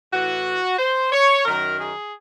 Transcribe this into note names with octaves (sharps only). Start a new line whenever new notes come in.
A2 E3 F#4
C5
C#5
F#2 D#3 F#3 A#4
G#4